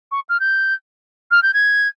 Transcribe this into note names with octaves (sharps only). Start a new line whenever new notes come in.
C#6
F6
G6
F6
G6
G#6